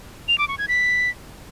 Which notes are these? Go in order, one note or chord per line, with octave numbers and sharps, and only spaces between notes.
F7
D6
C#6
G#6
B6